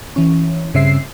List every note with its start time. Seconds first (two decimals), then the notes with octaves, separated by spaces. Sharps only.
0.16 E3 C#4
0.74 G2 C#3 C4 E5 C7